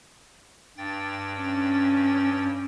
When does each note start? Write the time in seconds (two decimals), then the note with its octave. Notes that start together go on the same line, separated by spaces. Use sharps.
0.78 G2 G5 A6
1.37 C#4